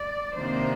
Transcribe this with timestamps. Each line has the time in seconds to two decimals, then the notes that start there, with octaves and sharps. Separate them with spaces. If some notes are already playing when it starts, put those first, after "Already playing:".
Already playing: D5
0.35 C3 D#3 A#3 D4 C5